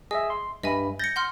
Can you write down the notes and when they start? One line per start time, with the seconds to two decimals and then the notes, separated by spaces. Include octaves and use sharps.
0.11 G#4 D#5 E5
0.30 C6
0.63 G2 D#5 E5 G#5 B5
0.99 G6 A6 A#6 C#7
1.16 F#5 C6 F6